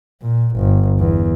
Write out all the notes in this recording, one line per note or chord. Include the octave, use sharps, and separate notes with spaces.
A#2
G1
E2